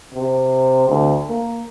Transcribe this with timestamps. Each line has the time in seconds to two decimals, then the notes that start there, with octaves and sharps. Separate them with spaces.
0.14 C3
0.89 D2
1.28 A#3